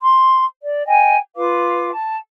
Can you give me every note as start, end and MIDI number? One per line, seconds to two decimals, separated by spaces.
0.01 0.44 84
0.62 0.83 74
0.86 1.16 75
0.86 1.16 79
0.86 1.16 80
1.35 1.90 65
1.35 1.90 71
1.35 1.90 77
1.35 1.90 86
1.93 2.15 81